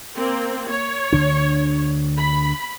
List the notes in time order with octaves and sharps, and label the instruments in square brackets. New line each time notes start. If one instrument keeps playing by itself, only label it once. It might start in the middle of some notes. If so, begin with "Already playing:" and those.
[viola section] A#3 C4
C#5
[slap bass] D2 D3 D4
[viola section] B5